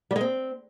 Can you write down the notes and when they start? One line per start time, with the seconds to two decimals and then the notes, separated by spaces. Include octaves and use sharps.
0.11 G3
0.16 G#3
0.21 C4